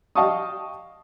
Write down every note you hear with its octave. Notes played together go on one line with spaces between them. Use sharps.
D#5 F5 G5 A5 C#6 D#6